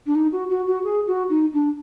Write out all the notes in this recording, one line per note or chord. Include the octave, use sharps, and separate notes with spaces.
D4
D#4
F#4
F#4
F#4
G#4
F#4
D#4
D4